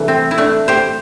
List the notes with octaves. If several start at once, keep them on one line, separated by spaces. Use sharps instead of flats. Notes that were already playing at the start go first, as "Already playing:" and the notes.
Already playing: C3 E3 G3 A3 D4 E4
C4
E4
A3 D4
G4 C5